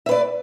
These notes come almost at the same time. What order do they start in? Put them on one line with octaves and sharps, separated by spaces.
E5 B4 D5